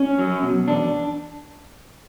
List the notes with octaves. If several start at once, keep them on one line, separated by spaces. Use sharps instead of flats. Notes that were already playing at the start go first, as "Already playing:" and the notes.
Already playing: C#4
F#3
B2
E2 D4